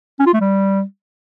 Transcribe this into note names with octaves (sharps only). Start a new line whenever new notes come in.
C#4
F4
A3
G3